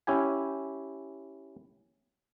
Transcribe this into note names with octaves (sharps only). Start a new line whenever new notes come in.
C#4 E4 G4 G#5